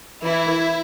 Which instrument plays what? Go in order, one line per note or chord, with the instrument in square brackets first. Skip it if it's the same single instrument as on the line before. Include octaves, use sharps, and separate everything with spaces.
[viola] E3 [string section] E4